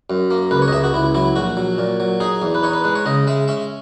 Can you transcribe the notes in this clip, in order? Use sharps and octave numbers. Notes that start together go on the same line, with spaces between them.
F#2
A#3
C#2 B4
C#5
D#5
C#2 E5
F#4
C#2 E4
F#3 E4
A#1 F#4
F#3
A#2
F#3
D#4 G#4
E2
B4
D#4 C#5
B4
G#3 B4
C#5
C#3 D#5
G#3 E5
C#4 E5